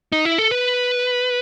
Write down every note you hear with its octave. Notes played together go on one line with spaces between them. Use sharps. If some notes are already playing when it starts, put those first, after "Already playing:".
D#4
E4
A4
B4